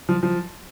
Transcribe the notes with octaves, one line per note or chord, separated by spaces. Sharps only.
F3
F3